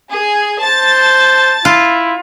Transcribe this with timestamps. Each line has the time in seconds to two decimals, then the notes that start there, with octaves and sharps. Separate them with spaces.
0.11 G#4 G#5
0.62 C5 A5 A6
1.65 E4 F4